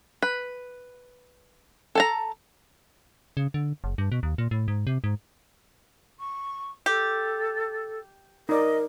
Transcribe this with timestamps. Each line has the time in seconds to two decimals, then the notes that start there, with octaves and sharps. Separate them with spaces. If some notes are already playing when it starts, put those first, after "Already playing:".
0.23 B4
1.95 A4 A5 A#5
3.37 C#3
3.54 D3
3.84 F#1
3.98 G2
4.12 B2
4.23 D#2
4.38 A#2
4.51 A2
4.68 G#2
4.87 C3
5.04 G#2
6.19 C#6
6.86 G4 A4
8.49 D#4 A#4 D5 D#5